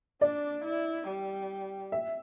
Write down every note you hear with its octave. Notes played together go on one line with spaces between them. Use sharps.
D4 D5
E4
G3
E5